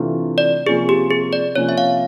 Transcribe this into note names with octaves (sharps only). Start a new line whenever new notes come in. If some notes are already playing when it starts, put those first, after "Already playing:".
Already playing: C3 E3 A3 D4 F4
D5
C3 F3 A#3 C#4 F4 G#4
G4
G#4
D5
C3 F3 A#3 C#4 F4 C#5
E5
F5